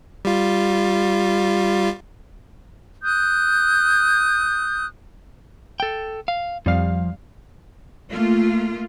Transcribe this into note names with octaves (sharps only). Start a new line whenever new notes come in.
G3 F4
D#6 F#6 G6
A4 G5
F5
F2 F3 G3 F5
A3 A#3 F4